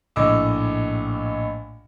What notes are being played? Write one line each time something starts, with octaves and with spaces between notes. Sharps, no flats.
A#1 A2 D#5 D6 E6